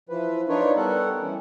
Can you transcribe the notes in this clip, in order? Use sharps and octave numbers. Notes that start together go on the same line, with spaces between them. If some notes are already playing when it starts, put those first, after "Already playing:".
E3 F3 B4
D4 D#4 F4 A#4 B4 C#5
G3 B3 A4 A#4 F#5
E3 G3 C#4